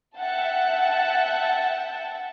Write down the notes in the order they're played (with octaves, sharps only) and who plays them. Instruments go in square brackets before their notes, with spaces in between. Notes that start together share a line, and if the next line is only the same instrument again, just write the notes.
[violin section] E5 F#5 G5 A5